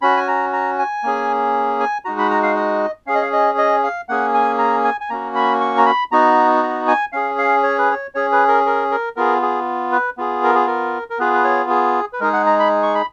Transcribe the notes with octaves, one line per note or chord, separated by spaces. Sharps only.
C#4 F#4 B5
G#5
A#5
A#5
G#5
A#3 C#4 G#4
G#5
G#3 D#4 F#4 A#5
B5
A#5
F5
D#5
C#4 G#4 F5
D#5
F5
D#5
D#5
F5
A#3 C#4 G#4 F#5
G#5
A#5
G#5
G#5
A#3 C#4 F#4 A#5
B5
C#6
A#5
B5
B3 D#4 F#4 A#5
A#5
G#5
C#4 G#4 F5
F5
C#5
B4
C#5
C#4 G#4 C#5
B4
A#4
A#4
A#4
B3 F4 G#4 A#4
G#4
B4
B3 F4 G#4
A#4
G#4
A#4
A#4
B3 F4 G#4 B4
B4
C#5
G#4
B4
G#3 D#4 G#4 A#4
F#5
A#5
B5
C#6
B5